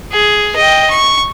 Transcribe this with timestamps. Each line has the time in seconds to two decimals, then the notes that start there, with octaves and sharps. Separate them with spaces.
0.12 G#4
0.56 D#5 G5
0.90 C#6